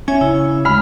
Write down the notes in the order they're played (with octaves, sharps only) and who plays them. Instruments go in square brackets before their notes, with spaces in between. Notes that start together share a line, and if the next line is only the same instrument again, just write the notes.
[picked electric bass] C#4 [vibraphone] C#5 E5 G#5
[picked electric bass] C#3 [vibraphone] E4
[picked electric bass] D2 [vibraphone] G#3 [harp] B5 F6